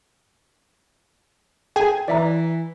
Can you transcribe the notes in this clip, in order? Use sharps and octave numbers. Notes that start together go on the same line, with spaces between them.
G#4 G5 G#5
E3 D5 E5 A#5